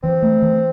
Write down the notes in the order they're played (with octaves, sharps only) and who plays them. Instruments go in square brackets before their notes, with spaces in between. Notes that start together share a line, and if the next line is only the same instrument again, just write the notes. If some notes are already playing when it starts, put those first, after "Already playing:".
[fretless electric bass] E3 [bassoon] C4
[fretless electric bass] A3
E3